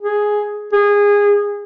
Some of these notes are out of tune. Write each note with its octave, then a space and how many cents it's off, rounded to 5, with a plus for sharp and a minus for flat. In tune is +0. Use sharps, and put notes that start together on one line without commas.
G#4 +5
G#4 -20